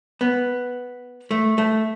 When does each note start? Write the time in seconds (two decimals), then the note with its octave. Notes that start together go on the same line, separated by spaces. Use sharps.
0.21 B3
1.31 A3
1.58 A3